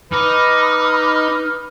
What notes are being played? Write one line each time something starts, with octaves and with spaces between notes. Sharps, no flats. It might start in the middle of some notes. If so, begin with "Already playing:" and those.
D#4 B4 B5 D6 D#6 F6